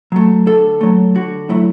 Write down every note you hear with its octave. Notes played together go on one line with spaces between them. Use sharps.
F#3 A3
D3 A4
F#3 A3
D3 F#4
F#3 A3 E4